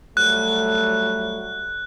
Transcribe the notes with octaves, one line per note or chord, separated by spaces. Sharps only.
F#3 G3 A3 F#6